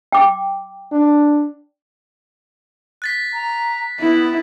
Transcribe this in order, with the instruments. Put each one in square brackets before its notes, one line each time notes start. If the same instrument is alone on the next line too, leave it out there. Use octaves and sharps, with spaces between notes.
[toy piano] G5 D6
[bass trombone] D4
[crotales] F#6 A6 B6
[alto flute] A#5
[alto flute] B3 [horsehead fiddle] E4